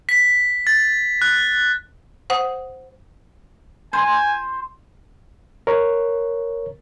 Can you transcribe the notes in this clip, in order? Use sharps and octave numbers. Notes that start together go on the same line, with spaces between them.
B6
A6
F#6
C5 F#5 D#6
C5 G#5 C6
A#4 C#5